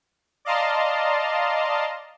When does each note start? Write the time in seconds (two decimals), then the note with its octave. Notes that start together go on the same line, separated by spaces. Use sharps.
0.45 D5 D#5 F5 A5 A#5 C6